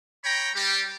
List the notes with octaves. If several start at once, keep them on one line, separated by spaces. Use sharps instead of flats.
C#5 G5 A#5 B5
G3 G4